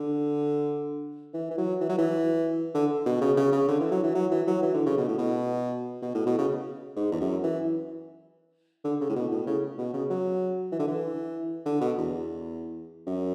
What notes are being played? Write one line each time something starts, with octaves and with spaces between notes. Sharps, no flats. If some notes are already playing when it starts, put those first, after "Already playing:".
Already playing: D3
E3
E3
F#3
E3
F#3
E3
D3
B2
C#3
C#3
C#3
D3
E3
F#3
E3
F#3
E3
F#3
E3
D3
C#3
B2
A2
B2
B2
A2
B2
C#3
G#2
E2
F#2
E3
D3
C#3
A2
B2
A2
C#3
B2
C#3
F#3
E3
D3
E3
D3
B2
E2
F#2